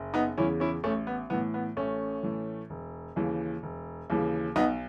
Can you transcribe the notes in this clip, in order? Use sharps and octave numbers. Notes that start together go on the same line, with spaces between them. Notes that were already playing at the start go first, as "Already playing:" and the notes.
Already playing: F#1
B3 D#4
E2 C#3 E3 C#4 E4
C#4 E4
A1 A3 C#4
B3
A2 E3 B3
B3
A1 A3 C#4
A2 E3
E1
D#2 C#3 E3
E1
D#2 C#3 E3
B1 B3 D#4